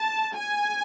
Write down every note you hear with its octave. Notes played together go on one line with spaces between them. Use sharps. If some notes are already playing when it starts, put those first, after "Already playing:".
Already playing: A5
G#5